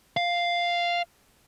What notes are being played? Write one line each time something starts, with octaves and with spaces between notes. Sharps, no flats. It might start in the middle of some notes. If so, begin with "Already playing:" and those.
F5